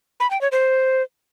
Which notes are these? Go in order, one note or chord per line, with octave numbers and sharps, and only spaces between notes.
B5
G5
C#5
C5